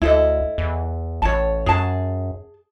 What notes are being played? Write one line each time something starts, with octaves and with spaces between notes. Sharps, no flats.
D2 E4 A4 D#5
E2
A1 C#5 A5
F#2 G#4 A5